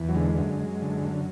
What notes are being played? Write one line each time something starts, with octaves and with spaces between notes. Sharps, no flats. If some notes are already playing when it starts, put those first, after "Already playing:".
Already playing: E2
F#3
D3 G#3
F#2
F#2
D3
F#2